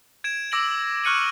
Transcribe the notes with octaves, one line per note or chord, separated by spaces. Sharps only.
G#6 D7 E7
D6 E6 A#6 D7 F#7
C#6 F6 F#6 C#7 D#7 F#7